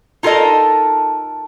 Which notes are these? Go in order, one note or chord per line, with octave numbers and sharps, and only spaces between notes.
D#4 F4 A4 A#4 D#5